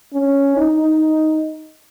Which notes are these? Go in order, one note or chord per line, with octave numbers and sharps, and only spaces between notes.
C#4
D#4